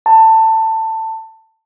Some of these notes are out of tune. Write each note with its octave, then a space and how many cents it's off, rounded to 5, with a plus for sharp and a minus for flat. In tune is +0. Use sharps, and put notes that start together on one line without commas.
A5 +20